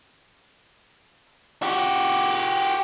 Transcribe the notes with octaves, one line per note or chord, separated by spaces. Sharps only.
F#4 G4